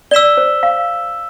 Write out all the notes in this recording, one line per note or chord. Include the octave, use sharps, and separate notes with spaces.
D5 E6 B6 E7 G7
C5
F5